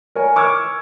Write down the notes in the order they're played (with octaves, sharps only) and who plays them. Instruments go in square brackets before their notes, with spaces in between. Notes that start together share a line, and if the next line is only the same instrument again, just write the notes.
[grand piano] A#4 C#5 G#5
C#6 D6 E6 F6 G#6